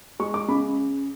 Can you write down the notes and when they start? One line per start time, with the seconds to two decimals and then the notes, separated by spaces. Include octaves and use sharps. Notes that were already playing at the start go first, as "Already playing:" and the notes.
0.20 G#3 C#6
0.34 D6
0.48 C#3 B5